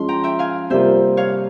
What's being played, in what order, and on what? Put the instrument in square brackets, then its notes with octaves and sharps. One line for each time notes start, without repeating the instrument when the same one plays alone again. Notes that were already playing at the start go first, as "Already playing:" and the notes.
Already playing: [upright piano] F3 G#3 C#4 [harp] C6
[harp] G5 A#5
E5 G5
F5 G#5
[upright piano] C3 G3 A#3 F4 [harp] C5 E5
[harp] C#5 F5